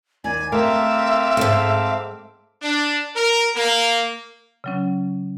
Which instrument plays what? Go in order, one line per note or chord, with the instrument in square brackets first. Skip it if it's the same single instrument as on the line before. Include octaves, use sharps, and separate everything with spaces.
[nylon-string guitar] D#2 D5 [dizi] G#5
[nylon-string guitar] A3 G4 A#4 [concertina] C4 F5 D6 [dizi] E5
[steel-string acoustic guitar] D2 G#2 [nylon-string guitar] A4
[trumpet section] D4
A#4
A#3
[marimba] C#3 F#3 C#4